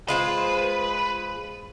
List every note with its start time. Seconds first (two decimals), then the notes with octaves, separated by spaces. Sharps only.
0.08 G#3 F4 B4 C5